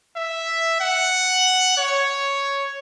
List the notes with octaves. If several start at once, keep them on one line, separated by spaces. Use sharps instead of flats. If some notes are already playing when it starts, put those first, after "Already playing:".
E5
F#5
C#5